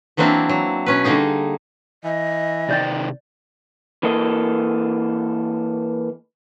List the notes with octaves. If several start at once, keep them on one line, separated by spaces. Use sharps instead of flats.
E3 F#3 A#3 C4 D4 E4
F#3
B2 C#4 B4
D3 G3 A#3 D#4 G#4
E3 D#5
C3 D#3 D5 G5 G6 A6
E3 A#3 A4 D#5